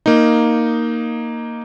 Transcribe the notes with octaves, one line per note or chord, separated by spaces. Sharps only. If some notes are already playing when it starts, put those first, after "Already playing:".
A#3 D#4